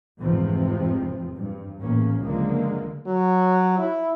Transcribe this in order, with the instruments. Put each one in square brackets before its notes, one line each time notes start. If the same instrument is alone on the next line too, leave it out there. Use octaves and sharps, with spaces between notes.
[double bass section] F1 E2 G#2 C3 F3 C4
G2
A1 E2 A#3 C#4
C#2 F#2 D3 F3 G#3 A#3
[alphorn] F#3
E4